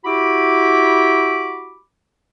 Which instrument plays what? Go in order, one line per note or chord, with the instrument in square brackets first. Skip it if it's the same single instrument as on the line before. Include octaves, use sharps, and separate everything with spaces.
[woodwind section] E4 F#4 G4 B5 D6